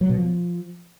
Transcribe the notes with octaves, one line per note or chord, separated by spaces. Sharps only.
F#3
B2
F3